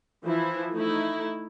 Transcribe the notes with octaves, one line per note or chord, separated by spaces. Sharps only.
E3 F3 E4
A3 D#4 E4